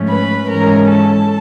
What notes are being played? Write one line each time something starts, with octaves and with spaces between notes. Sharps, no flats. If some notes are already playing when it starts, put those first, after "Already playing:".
Already playing: G#2 F3 A3 C#4
B4 B5
G#2 E3 G#3 C#4 A#4 A#5
A4 A5